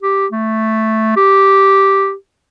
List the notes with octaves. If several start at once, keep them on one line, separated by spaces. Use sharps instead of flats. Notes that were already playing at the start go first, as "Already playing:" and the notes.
G4
A3
G4